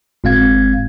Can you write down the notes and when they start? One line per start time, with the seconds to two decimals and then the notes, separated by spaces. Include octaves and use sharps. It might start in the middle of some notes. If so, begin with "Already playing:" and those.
0.24 G1 A2 G#3 C4 F5 G#6